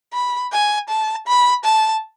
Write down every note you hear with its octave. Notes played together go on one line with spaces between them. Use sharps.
B5
G#5
A5
B5
A5